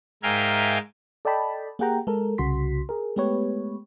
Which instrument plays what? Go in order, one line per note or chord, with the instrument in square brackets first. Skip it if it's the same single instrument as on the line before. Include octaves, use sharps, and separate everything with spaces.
[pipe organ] G#2 A#4 E5 F5 G5 G#5
[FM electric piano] A4 D5 D#5 G5 A5 B5
A#3 G4 G#4 F#5 G5 A#5
G#3 A4 A#4
C2 C#3 F#4 C6 B6
G#4 A#4
G#3 A3 B3 G4 B4 C#5